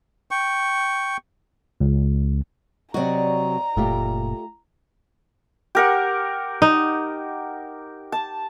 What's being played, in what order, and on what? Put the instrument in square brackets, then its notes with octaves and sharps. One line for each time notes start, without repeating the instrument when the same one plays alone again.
[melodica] G5 C#6
[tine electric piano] C#2
[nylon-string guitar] C3 F#3 F#4 [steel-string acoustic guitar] D5 D#5 [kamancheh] A#5
[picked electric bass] F#1 A#2 [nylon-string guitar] A3 F4 G4
[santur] G4 A#4 F#5
[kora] D#4
[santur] A5